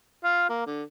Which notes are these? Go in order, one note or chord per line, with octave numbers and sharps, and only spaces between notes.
F4
A#3
D3